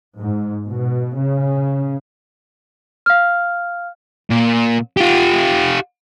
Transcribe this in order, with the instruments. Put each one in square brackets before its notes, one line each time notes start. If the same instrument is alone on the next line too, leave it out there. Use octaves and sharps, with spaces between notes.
[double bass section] G#2
B2
C#3
[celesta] F5 F6
[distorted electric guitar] A#2
F4 G4